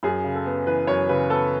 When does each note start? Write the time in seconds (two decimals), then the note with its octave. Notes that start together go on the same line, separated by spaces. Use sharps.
0.03 F#2 G#4
0.24 C#3
0.35 A4
0.46 B3
0.67 E3 B4
0.87 F#2 C#5
1.09 C#3 B4
1.30 B3 A4